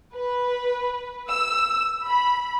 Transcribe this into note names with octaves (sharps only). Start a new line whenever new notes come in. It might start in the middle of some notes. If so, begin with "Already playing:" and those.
B4
E6
B5